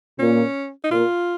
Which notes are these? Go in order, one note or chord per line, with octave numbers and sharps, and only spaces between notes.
A#2 C#4
D#4
A#2 F4